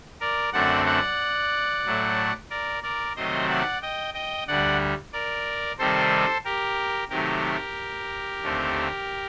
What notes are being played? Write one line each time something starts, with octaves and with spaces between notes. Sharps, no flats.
A#4 D5
F#2 D3 A3 C4 D5 F#5
D5 F#5
A2 F#3 A3
A#4 D5
A#4 D5
C3 D#3 F#3 A3 C4 C5 D#5
D5 F#5
D#5 G5
D#5 G5
D2 D3 G3 D5 F#5
A#4 D5
C3 D#3 G3 C4 A4 C5
G4 A#4
C3 D#3 F#3 A3 G4 A#4
D#2 D3 A3 C4